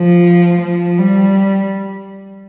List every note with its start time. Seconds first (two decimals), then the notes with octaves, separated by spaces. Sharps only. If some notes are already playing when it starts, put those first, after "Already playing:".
Already playing: F3
0.62 F3
0.98 G3